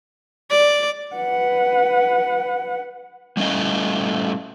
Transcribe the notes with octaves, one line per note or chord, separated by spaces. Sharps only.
D5
B4 F#5
G3 A3 C#4 E4 D#5